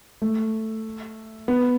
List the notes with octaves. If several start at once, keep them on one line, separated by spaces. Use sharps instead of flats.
A3
B3